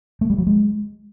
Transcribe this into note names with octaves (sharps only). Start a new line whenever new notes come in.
A3
G3
F#3
G#3